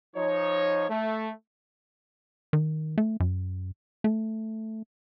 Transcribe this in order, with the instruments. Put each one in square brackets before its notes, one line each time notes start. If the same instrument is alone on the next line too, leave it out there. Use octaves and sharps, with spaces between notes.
[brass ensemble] F3 D#4 C#5
A3
[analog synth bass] D#3
A3
F#2
A3